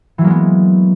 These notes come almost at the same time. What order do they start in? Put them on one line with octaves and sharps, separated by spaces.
E3 F#3 A#3 G#3 B3